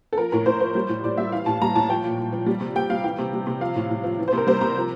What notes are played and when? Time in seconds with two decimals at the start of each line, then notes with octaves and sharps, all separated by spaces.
0.13 A4
0.18 F3 A#4
0.32 A2 A#4
0.46 A2 C5
0.60 F3 C5
0.75 G3
0.89 A2
1.04 A2 D5
1.17 G3 E5
1.32 E3 F5
1.46 A2 A5
1.61 G3 A#5
1.75 A2 A5
1.89 F3 G5
2.04 A#2
2.18 A#2
2.32 F3
2.46 G3
2.61 C3
2.75 C3 G5
2.90 G3 F5
3.04 E3 G5
3.19 C3
3.33 G3
3.47 C3
3.61 F3 F5
3.76 A2
3.90 A2
4.04 F3
4.19 E3
4.28 C5
4.33 C3 A#4
4.47 G3 C5
4.61 C3 A#5
4.76 F3